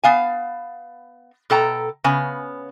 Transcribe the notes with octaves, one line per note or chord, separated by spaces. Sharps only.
B3 F5 G#5
B2 A4 G5 A#5
C#3 B3 G#5